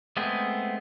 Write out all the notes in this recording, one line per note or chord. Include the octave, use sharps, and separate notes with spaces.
G#3 A3 B3 C4 G#4